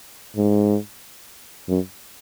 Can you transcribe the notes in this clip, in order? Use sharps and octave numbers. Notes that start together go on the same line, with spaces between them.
G#2
F#2